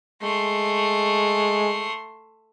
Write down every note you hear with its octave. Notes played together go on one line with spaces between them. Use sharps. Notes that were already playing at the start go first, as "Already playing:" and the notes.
G#3 A3 C6